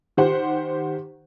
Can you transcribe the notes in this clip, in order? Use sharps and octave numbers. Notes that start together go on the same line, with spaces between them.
D#3 G4 C5 F#5